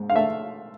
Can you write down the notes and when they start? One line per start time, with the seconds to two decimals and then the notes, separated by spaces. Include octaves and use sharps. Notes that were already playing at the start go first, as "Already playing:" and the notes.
Already playing: G#2
0.10 F5
0.16 A3 E5